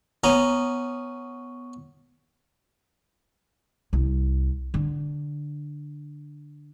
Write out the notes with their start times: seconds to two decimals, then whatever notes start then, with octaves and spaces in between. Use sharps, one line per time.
0.24 B3 C#4 A#5
3.93 C2
4.74 D3